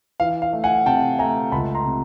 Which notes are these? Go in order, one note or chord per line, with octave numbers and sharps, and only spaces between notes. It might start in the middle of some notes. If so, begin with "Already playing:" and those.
E3 F5
F5
A3
F#5 G#5
C3 G5 A5
A3 G#5 A#5
C#2 A5 B5
A#5 C6
C3